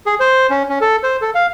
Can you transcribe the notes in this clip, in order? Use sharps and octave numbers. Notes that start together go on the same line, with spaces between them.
G#4
C5
C#4
C#4
A4
C5
A4
F5